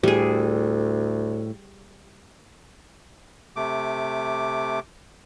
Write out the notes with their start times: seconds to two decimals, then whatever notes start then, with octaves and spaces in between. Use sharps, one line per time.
0.03 D2 A2 G3 G#4
3.56 C3 A3 D6